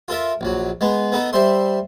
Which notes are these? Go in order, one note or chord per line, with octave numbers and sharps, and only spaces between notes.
F4 A4 A#4 E5
A#1 F#3
G#3 B3
B3 D#4 A4
G3 C5 E5 C6